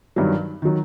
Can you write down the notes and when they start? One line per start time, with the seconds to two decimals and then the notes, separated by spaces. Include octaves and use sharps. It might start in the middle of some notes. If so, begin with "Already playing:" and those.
0.16 G2 D#3 F#3
0.62 D#3 F#3